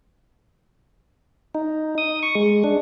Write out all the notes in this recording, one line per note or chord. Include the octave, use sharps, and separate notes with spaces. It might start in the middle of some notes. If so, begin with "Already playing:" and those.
D#4
D#6
C#6
G#3
D4